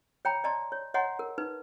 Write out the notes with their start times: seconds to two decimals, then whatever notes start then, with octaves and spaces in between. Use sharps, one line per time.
0.25 C#5 G5 A#5 B5
0.44 D5 D#5 A5 A#5 C6
0.72 C#5
0.94 C#5 D#5 F#5 G#5 A#5 C6
1.19 A#4
1.38 D#4 B4